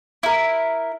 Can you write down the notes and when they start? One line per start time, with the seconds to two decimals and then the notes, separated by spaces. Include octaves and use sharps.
0.23 E4 A#4